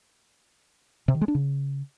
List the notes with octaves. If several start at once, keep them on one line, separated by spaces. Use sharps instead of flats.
C3
D#3
G#3
D4
C#3